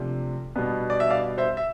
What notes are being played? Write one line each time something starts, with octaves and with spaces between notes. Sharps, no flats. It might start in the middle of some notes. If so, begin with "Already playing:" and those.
Already playing: C3 F3 A3 D4
B2 G3 B3 D4
D5
E5
D5 F5
C5 E5
E5